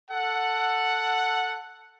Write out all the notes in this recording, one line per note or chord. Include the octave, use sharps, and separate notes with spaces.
A4 F#5